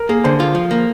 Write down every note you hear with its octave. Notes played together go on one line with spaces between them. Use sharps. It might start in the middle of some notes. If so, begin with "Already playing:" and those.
Already playing: A#4
A#3 G#4
D3 C5
F4
F3
A#3